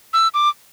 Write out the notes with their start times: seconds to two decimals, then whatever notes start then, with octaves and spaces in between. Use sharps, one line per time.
0.13 E6
0.34 D6